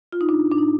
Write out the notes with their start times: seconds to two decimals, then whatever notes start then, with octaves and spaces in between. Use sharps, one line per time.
0.13 F4
0.21 D#4
0.29 A2 D4
0.51 A2 D4
0.58 D#4